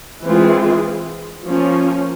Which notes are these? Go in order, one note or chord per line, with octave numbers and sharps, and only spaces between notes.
E3 G#3 C4 F4 G#4
F3 A#3 C#4